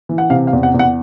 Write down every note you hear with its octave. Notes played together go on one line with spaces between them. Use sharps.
E3
F#5
C3 F5
F5
E2
F#5
E2
F#5